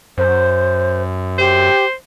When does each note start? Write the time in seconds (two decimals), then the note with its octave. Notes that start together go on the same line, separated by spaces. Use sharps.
0.18 F#2 C5
1.38 G4 C5